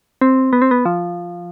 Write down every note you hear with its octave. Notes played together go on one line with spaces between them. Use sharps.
C4
B3
C4
B3
F3